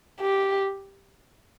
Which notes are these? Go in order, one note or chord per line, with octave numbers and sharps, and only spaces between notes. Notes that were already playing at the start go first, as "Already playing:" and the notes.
G4